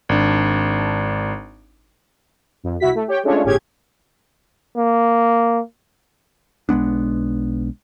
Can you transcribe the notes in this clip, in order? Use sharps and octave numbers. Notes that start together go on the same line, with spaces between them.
G#1 D4
F2
C2 E4 F#4 B6
A3
G4 C#5 G5
G#3 A3 C#4 D4 F4 C#5
G1 A2 C#4 G4 G#4 G#6
A#3
B1 G#3 B3 D4